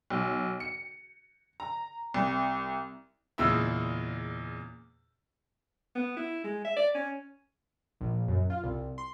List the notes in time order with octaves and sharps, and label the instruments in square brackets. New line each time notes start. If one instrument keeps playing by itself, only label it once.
[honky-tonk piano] B1
C#7
A#5
C2
[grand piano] E2 A#2 C#3 G#3 E4 E6
[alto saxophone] B3
E4
G#3
E5
D5
C#4
[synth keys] A#1
F#2
F4
C2
C6